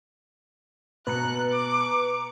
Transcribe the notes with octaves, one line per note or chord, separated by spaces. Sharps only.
B2 B4 A#5 F#6 C#7
D6